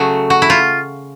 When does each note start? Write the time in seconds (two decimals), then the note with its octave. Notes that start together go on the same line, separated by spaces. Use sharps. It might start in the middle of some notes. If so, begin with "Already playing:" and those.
Already playing: C#3 F#3 A3 F#4
0.30 F#4
0.42 E4
0.50 F4